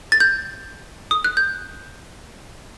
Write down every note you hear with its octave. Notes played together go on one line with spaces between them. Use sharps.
A6
G6
D#6
F#6
G6